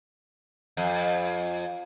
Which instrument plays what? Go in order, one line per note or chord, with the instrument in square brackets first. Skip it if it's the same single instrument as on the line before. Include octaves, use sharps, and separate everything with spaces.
[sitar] F2